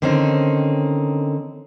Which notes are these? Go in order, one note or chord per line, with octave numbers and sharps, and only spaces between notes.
D3 D#3 C4 C#4 D#4